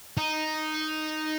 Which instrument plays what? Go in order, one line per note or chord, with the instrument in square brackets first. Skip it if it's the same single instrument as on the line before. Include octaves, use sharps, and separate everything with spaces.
[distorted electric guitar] D#4